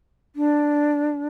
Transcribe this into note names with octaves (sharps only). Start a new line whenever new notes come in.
D4